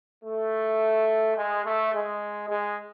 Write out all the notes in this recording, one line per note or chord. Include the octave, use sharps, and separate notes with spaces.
A3
G#3
A3
G#3
G#3